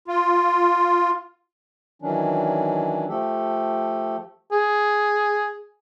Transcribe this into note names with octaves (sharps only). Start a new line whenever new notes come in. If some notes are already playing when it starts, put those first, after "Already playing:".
F4
D#3 E3 F#3 C#4 D4
F3 A3 G4 A4
G#4